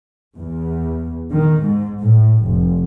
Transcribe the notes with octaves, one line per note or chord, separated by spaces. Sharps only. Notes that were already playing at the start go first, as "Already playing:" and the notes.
E2
D#3
G#2
A2
F1